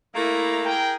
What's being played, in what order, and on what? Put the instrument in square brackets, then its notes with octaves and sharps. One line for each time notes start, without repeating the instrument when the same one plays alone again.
[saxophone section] A3 A#3 [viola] E4 A#5
[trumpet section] G#4 A#4 G5